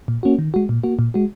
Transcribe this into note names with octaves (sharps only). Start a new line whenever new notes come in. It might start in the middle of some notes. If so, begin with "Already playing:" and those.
A#2
A#3 C#4 F#4
D#3
G#3 F#4
A#2
A#3 F#4
A#2
G#3 F#4